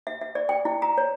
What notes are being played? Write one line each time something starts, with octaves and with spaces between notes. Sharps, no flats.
E5
E5
D5
G5
E4
A#5
C#5